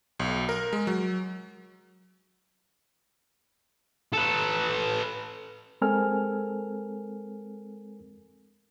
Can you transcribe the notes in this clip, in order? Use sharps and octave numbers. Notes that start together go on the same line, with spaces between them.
B1
A#4
G#3
F#3
A4 B4
G#3 C4 A4 A#4 G#5 F6